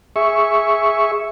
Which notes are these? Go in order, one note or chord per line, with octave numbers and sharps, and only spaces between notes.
G#4 E5 C#6